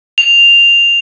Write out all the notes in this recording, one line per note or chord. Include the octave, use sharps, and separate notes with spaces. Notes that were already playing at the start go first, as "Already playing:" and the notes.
F7